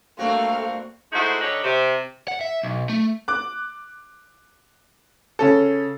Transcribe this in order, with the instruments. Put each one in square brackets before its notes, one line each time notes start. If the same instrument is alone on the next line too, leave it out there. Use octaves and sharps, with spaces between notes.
[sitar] G2 C4 F#4 [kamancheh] A3 F5 [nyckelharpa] A#3
[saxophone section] G#3 A3 D#4 E4 F#4 C5
D3 D#4 G4 B4 C#5
C3
[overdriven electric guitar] F#5
E5
B1
A3
[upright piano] D6 F#6
C#3 C#4 A4